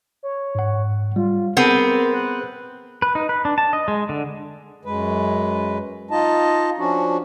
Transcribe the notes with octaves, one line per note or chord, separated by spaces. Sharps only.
C#5
G#2 F#5
G3 F4
B3 C4 G#4 A#4 B5
F#6
B4
D#4
B4
D4
A5
D#5
G#3
D3
F#2 G#3 B4
D#4 F4 D#5 A5
F3 C#4 D4 F#4